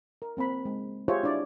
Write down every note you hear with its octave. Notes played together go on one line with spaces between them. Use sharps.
A#4
A#3 C4 A#4 B5
G#3
F4 G4 G#4 C5 C#5 E5
D4 E4 D5